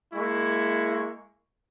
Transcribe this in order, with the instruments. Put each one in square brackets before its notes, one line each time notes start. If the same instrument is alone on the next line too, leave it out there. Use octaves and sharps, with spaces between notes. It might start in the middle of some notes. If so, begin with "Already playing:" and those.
[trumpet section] G#3 A#3 E4 C#6